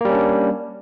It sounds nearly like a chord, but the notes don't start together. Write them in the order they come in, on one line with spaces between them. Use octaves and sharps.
A#3 G3 C#4 D4